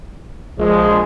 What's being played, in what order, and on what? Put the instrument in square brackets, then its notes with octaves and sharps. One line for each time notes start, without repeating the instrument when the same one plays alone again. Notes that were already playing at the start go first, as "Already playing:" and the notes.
[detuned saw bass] A#1 [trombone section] F3 G#3